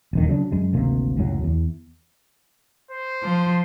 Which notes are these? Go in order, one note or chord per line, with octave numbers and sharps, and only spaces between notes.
D#1 F2 D#3
C#3 F#3 A#3 D4
F#2 G#3
G#1 D2 C3 A#3
C#2 F#2 A2 F#3
E2
C5
F3